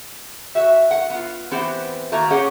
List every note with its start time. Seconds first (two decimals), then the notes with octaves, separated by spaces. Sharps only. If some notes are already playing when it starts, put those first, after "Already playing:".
0.55 F#4 E5
0.91 F#5
1.10 B3 F4
1.51 E3 B3 C4 G4 F#5
2.12 D#3 A3 A#3 F#4 A#5
2.30 A#3 C#4 G4 G#4 C#5 F#5